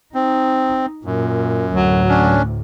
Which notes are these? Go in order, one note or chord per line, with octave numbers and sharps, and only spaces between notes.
C4 D#4
F#2 A#2
D2 A2 F#3
C#4 D4